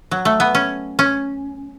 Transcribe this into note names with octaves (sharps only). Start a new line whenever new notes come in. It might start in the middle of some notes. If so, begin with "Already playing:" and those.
F#3
A3
B3
C#4
C#4